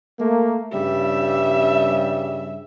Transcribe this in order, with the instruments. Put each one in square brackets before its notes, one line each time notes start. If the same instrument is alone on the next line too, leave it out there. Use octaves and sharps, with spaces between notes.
[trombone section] A3 A#3
[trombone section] G2 C#3 G3 [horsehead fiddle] E5